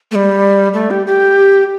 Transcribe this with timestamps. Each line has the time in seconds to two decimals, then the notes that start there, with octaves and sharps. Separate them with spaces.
0.11 A3
0.15 G3
0.74 A3
0.91 G4
1.07 G4